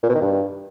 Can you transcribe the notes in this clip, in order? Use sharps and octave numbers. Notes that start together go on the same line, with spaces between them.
A#2
B2
D#3
G2